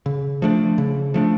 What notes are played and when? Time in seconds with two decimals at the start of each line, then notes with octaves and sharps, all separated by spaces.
0.06 C#3
0.42 F3 A3 D4
0.78 C#3
1.14 F3 A3 D4